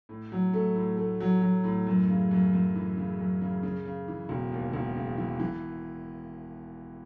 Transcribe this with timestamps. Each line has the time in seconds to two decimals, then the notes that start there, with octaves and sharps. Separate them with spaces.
0.09 A2
0.32 F#3
0.54 A3
0.76 A2
0.97 A3
1.20 F#3
1.42 F#3
1.64 A2
1.87 F#2
2.09 C#3
2.31 F#2
2.53 F#2
2.75 E3
2.97 C#3
3.19 F#2
3.41 C#3
3.63 C#3
3.85 C#3
4.08 E3
4.29 E1
4.52 D#2
4.73 E1
4.96 C#3
5.17 E3
5.40 E3